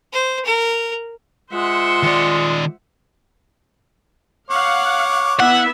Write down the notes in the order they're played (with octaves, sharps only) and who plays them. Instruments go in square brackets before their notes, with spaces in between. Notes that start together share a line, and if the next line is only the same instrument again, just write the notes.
[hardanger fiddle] C5
A#4
[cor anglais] G#3 [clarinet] F4 [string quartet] C5 E5 F#5
[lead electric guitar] D#3 D5
[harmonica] C#5 D6 [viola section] F5 F#5
[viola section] B3 E4 E5 [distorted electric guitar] F#5